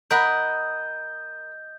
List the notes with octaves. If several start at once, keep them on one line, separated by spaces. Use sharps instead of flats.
A#4 D#5 F#5 B5 G6